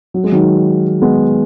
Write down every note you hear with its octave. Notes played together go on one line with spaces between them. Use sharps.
F#3
G#3
D#3 F#3
G#3 B3